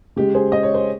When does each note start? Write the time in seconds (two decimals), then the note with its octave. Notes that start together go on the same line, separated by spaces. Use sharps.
0.16 C#3 G#3 G4
0.35 G#4 C5
0.52 D#5
0.63 C#5
0.74 C5